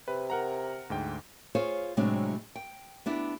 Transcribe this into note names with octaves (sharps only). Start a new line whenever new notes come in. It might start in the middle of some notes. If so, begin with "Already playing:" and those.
C3 B4
A#4 F#5 A#5
D2 G#2 G5
F4 G#4 C5 C#5 F5 G#5
A2 C3 F#3 G#3 C4 D4
G5
B3 D4 E4 G4